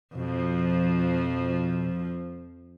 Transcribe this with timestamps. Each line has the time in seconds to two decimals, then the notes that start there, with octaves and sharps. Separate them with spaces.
0.16 F2 B2 F3